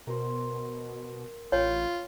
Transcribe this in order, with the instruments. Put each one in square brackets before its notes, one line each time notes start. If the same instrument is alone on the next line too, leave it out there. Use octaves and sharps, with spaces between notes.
[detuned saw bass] B2 [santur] A#4 C5
[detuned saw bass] A1 [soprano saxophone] F4 [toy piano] C#5 [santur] G5 B5 C#6